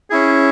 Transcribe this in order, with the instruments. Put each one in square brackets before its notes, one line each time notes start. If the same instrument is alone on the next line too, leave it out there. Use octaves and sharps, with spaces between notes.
[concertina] C#4 E4 G#4